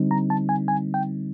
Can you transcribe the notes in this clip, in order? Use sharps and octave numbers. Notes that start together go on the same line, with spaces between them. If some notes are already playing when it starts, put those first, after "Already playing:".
Already playing: D3 G3 C4 D#4
A#5
A5
G#5
G#5
G5